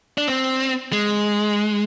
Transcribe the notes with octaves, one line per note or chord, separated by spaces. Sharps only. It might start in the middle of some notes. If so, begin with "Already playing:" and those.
D4
C4
G#3